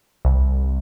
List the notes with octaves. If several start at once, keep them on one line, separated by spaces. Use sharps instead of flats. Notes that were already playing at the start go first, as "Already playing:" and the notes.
C2